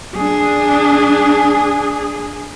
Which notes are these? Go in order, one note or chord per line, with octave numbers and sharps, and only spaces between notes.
D4 G#4